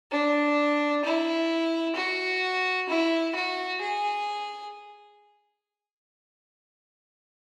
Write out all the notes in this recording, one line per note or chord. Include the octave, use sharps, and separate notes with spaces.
D4
E4
F#4
E4
F#4
G#4